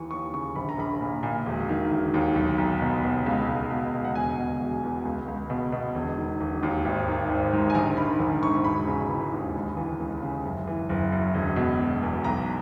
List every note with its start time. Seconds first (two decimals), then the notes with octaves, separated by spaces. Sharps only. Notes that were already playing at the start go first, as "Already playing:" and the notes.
Already playing: D#2 E3 C#6
0.11 D#2 C#6
0.33 C#3 C#6
0.56 A#1 B5
0.69 A#5
0.78 A#1 B5
1.01 A#2
1.23 A#2
1.46 E1
1.69 D#3
1.91 E1
2.14 D#2
2.35 B1
2.58 B1
2.81 B2
3.04 B2
3.26 C#2
3.49 C#2
3.71 B2
3.94 B2
4.05 F#5
4.15 E1 G#5
4.39 B2
4.61 E1
4.83 E2
5.05 C#2
5.28 C#2
5.50 B2
5.72 B2
5.95 E1
6.18 D#3
6.41 E1
6.63 D#2
6.85 G#1
7.08 D#3
7.29 G#1
7.53 G#2
7.70 G#5
7.75 A#1 A#5
7.97 D#3 B5
8.20 A#1
8.43 G#2 C#6
8.64 E1 B5
8.87 C#3
9.09 E3
9.32 D#2
9.54 C#2
9.77 E3
10.00 C#2
10.22 C#3
10.45 F#1
10.67 E3
10.89 F#1
11.12 F#2
11.35 E1
11.56 B2
11.79 E1
12.02 E2
12.24 B1 A#5